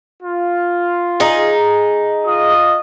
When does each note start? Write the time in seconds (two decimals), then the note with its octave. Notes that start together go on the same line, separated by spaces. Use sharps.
0.23 F4
1.20 D#4 G#4
2.26 F4 D#5 D#6